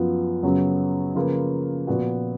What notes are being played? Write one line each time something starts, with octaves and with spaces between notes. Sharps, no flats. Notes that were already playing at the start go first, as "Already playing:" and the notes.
Already playing: F#2 F3 B3 F4
F#2 C#3 F#3 B3
C#3 F3 A#3 F4 B4
A#2 F3 B3 F#4